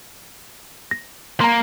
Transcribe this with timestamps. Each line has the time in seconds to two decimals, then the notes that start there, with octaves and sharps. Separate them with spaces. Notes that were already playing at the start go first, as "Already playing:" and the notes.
0.91 A#6
1.40 A#3 A#5 C6